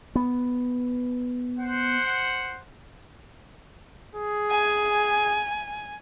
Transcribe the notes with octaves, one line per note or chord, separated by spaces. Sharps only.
B3
C5 F#5
G#4
G#5